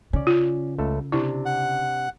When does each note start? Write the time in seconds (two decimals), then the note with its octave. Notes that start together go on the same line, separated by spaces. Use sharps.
0.13 C#3 C#4 D5
0.27 F4
0.78 C#2 A3 A4
1.12 C3 D4 E4
1.46 F#5